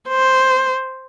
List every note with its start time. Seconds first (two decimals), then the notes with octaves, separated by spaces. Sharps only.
0.08 C5